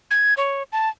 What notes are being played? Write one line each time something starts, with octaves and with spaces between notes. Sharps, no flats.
G#6
C#5
A5